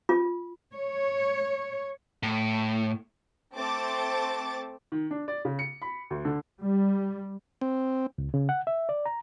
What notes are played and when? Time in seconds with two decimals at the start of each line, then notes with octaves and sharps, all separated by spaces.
0.09 F4
0.75 C#5
2.23 A2
3.53 A3 C4 C5 A5 D6 A6
4.92 D#3
5.11 D4
5.28 D5
5.45 C#3
5.59 C#7
5.82 B5
6.10 D2
6.25 D3
6.61 G3
7.61 C4
8.18 C#2
8.34 C#3
8.49 F#5
8.67 E5
8.89 D5
9.06 A#5